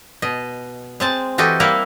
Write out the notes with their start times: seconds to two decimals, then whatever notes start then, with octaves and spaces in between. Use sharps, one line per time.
0.22 B2 D#5
1.00 G#3 C4 A5
1.38 E3 F#4 G4 A4 D#5
1.60 G3 A#3 E4 A#4 F5 F#5